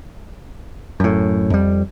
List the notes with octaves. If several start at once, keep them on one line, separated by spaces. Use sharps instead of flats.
F#2 A2
F2 G3